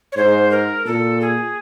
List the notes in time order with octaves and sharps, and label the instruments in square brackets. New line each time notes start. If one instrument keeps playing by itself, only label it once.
[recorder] C#5
[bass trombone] G#2 [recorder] C5
[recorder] A#4
[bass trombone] A#2 [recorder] A4
[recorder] G#4